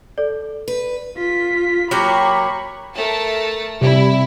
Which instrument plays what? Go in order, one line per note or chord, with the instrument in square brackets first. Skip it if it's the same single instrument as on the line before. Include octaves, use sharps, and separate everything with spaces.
[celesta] A4 D5
[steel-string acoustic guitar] B4
[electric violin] F4 B6
[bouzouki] F#3 A#3 G4 [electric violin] B5 C#6
[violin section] A3 A#4 A5
[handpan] C3 [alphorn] G3 [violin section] E4